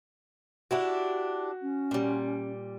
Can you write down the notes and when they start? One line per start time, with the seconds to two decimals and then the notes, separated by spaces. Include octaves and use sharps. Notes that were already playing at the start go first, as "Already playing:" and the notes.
0.71 D4 E4 F#4 G4
1.62 C#4
1.91 A#2 G3